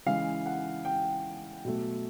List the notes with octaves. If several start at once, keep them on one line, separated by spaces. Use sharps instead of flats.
C#3 E3 G#3 F5
F#5
G5
B2 F#3 A3